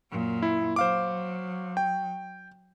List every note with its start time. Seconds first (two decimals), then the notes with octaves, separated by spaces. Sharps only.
0.11 F#2 A#2
0.42 E4
0.76 F#3 C5 F5 D6
1.77 G5